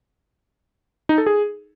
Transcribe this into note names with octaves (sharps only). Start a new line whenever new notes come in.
D#4
A4
G#4